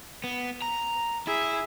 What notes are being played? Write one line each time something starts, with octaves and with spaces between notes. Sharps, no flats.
B3
A#5
E4 G#4 E5